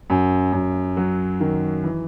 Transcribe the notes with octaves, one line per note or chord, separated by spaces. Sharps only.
F#2
F#2
F#3
D#3
E3